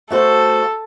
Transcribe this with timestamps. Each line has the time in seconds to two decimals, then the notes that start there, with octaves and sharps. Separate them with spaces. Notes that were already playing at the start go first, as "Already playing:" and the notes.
0.11 A3 F#4 A4 C5